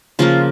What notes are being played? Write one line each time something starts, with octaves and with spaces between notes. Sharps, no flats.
C#3 F3 A#3 F4